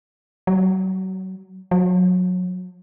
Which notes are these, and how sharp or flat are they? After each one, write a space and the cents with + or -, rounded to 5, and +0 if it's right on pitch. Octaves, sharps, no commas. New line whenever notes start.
F#3 +30
F#3 -25